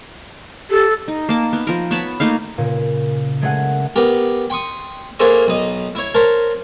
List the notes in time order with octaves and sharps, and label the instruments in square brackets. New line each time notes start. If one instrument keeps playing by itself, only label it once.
[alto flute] G4 [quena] A4
[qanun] D#4
A#3 A5
B3
F3 A#4
B3 C#5 A5 B5
A3 A#3 D#4 F5
[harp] A#2 C#3
G#3 A3 C#4 G#4 C#5 F#5
[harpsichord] B3 G4 A#4 G5
G5 C6 C#6 D#6
A#3 E4 G#4 A4 C5 C#5
B1 D#4
E4 C#5
A#4 C5 C#5 A5